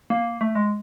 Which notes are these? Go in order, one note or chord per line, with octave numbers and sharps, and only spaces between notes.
A#3
A3
G#3